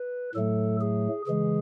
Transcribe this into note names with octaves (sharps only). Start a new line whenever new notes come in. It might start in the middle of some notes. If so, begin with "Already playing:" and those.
Already playing: B4
A2 F#3 A3 A4
G#4
C#3 E3 G#3 G#4